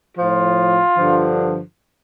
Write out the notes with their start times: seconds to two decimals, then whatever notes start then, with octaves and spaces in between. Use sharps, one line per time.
0.17 A2 F3 F4
0.97 G2 D3 F3